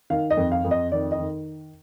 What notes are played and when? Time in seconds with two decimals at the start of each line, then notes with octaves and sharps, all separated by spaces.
0.10 D#3 F5
0.30 D#5
0.37 F2
0.52 F5
0.64 F2
0.71 D#5
0.92 D#3 D5
1.12 D#5
1.19 D#3